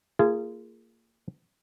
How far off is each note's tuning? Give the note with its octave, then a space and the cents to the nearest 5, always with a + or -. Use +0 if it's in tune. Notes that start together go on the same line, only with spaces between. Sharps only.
A#3 -25 F4 -25 G#4 -5